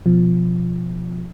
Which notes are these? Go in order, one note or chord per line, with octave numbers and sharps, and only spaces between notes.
B2 F3